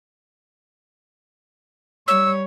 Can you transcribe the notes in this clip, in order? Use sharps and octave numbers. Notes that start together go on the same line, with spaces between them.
G3 C#5 E6